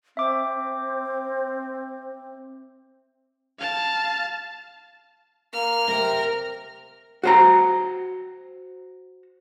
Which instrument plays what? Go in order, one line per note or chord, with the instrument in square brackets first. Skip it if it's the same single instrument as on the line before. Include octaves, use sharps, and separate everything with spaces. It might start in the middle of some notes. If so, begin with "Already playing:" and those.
[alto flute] C4 [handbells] E5 D6
[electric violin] F5 A5
[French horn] A#3 [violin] F6
[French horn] C3 [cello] A#4
[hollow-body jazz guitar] F#4 C5 A#5